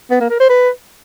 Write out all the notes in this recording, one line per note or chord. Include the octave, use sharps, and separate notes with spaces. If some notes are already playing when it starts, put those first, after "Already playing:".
B3
A#3
A#4
C5
B4